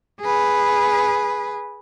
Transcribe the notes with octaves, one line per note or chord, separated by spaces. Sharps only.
G#4 B4